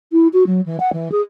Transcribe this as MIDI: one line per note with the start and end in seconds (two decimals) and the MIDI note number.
0.12 0.28 64
0.33 0.44 66
0.47 0.61 54
0.66 0.79 52
0.80 0.90 78
0.93 1.12 52
1.12 1.21 68